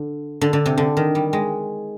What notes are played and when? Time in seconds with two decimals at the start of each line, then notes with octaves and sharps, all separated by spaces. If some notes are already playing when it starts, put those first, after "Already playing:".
Already playing: D3
0.41 D3
0.53 D3
0.66 C3
0.78 D3
0.97 D#3
1.15 G3
1.33 G#3